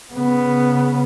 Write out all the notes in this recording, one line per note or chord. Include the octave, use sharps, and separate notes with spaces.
C#3 B3